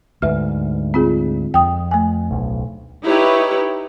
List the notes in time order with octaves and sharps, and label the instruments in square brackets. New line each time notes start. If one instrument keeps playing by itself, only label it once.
[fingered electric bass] D2 G#2 [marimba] B4 E5 F6
[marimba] C4 F4 G#4
[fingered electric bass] F2 [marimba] G5 D#6
[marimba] A3 G#5
[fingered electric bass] D1 B1
[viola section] D#4 E4 G4 B4 C#5